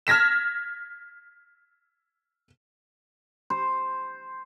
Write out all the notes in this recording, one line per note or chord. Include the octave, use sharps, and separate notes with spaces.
F6 G#6 A#6 B6 E7
C5